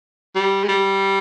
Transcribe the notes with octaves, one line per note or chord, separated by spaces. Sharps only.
G3
G#3
G3